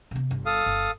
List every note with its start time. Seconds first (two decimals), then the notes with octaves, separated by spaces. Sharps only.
0.11 C3 B3
0.31 G1
0.46 A4 F5 D#6
0.66 G1